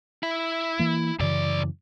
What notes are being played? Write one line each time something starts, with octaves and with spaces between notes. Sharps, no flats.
E4
E3 A#3
C2 F#2 C#3 E3 D5